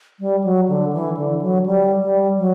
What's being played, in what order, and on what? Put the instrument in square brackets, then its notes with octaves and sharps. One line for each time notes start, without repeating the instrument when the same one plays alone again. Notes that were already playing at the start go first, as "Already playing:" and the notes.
[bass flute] G3
F#3
D3
E3
D3
F#3
G3
G3
F#3